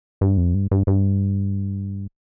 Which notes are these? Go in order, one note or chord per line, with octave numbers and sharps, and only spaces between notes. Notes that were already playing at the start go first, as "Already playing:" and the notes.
G2
F2
G2
G2
G2